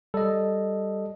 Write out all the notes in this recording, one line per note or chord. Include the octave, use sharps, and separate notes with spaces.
G3 A4 D#5